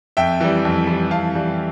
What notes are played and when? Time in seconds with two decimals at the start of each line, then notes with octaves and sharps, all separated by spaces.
0.17 F2 E5 G5
0.41 E3 G3
0.65 F2
0.87 E3 G3
1.11 F2 F5 A5
1.35 E3 G3